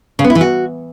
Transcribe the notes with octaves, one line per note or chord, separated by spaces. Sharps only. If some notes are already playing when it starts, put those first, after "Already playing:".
C#3
B3
E4
E3
F#4